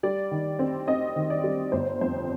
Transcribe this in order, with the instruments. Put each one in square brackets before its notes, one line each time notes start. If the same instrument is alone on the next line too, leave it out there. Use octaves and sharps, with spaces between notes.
[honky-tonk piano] G3 D5
D#3
C4
C4 D#5
D#3
D5
G3
G1 C5
F2 C5